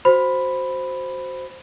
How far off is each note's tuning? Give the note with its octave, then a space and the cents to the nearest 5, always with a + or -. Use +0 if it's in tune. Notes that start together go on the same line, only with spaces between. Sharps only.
F#4 +0 C5 +0 B5 +0